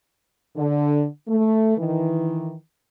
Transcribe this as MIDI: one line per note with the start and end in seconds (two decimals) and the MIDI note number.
0.57 1.04 50
1.28 1.77 57
1.77 2.55 51
1.77 2.55 52